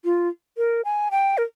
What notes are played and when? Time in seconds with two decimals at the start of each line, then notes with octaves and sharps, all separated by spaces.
0.05 F4
0.58 A#4
0.85 G#5
1.11 G5
1.38 A#4